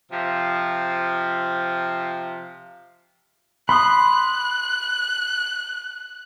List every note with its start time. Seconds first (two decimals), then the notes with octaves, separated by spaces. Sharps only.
0.11 C3 F3
3.69 B5 C6 D#6 F#6